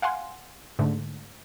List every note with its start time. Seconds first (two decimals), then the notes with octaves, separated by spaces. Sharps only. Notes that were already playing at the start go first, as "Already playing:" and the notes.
0.02 F5 F#5 G#5 C6
0.79 G#2 D3 A3